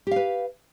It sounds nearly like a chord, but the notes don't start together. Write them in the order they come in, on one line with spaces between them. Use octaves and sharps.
G4 F5 B4